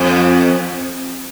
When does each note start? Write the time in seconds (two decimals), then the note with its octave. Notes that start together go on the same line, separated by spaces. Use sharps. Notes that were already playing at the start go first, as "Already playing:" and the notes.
Already playing: F2